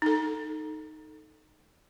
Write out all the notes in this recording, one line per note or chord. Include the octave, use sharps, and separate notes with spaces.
D#4 A4